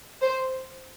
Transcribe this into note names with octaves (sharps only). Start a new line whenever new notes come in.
C5